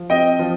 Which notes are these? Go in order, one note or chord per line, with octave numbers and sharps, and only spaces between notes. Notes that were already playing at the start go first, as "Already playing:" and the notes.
Already playing: F3
C4 D#5 G5
F3